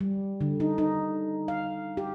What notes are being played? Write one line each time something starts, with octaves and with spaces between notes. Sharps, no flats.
G3
D3
D#4
D#4
F5
G4